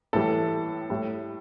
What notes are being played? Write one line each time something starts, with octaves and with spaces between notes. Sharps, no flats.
A2 E3 G3 A4
A2 G3